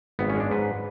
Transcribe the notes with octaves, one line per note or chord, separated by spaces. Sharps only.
G#1 B3
C#4
G#3
D4
G#2 B4